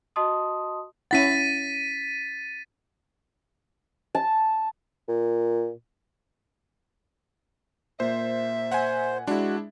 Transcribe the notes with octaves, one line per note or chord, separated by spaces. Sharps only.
F#4 D#5 A5 C6 D#6
C#4 E4 F#5 A6 B6 D#7
A5
A#2
A#2 C5 E5
C5 F#5 G#5
G#3 D4 E4 F#4